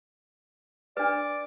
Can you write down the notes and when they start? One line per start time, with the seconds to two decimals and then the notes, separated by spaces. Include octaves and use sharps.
0.97 D4 B4 D5